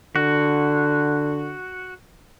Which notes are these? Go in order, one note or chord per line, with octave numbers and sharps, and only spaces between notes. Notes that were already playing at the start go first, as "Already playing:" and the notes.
D3 F#4